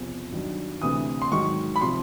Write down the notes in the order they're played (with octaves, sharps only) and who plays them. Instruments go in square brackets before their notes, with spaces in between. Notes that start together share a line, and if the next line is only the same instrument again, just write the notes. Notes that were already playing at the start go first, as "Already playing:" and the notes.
Already playing: [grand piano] E2 C3 F3
G2 D#3 F#3
D2 C3 E3 D#6
C6
G#2 D#3 F#3 C#6
B5
C3 F3 C6